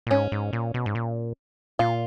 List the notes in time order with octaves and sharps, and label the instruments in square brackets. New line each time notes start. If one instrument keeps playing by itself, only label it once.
[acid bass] A#2
[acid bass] G#2 [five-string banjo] C#4
[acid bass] G#2
A#2
B2
G#2
A#2
[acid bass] A#2 [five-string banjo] F4